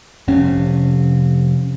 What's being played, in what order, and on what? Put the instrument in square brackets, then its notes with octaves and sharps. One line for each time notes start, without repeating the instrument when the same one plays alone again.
[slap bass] F1 C3 C#4